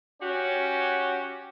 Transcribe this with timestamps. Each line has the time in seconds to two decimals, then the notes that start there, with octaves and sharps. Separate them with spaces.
0.21 C#4 F#4 G4